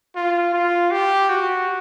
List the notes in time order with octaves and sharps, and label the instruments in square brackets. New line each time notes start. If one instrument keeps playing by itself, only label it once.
[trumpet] F4
F4
G4
F#4